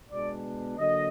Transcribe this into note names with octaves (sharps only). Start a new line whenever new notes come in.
B2 G#3 B3 D4 D5
D3 F#3 A#3 D#5